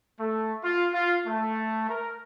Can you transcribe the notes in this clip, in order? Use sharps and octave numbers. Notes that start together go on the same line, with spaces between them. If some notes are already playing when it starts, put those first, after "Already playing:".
A3
F4
F4
A3
A#4